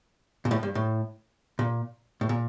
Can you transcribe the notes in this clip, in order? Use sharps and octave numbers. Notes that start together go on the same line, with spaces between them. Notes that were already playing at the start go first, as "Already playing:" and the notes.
A#2
A2
G2
A2
A#2
A2
A#2